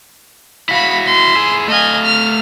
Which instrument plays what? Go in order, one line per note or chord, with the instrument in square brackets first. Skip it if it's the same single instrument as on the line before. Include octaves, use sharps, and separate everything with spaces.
[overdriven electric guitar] E4 F#4 [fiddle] F5 B5
[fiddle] C6
[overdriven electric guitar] E4 G#4
[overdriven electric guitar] A3 F5 [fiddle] D#5 G#5
[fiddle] F6